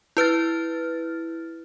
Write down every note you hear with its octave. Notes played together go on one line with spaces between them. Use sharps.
E4 B4 F6 A6